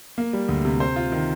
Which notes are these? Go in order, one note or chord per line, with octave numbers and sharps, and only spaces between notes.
A#3
G3
D2
C3
C5
F4
D#3